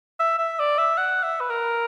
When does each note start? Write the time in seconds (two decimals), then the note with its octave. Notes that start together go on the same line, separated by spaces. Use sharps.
0.19 E5
0.38 E5
0.59 D5
0.78 E5
0.97 F#5
1.23 E5
1.40 B4
1.50 A#4